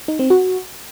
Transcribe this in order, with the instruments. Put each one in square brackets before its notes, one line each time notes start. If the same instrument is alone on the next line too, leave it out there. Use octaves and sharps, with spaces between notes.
[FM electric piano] D#4
C4
F#4